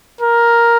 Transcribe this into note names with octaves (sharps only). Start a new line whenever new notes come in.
A#4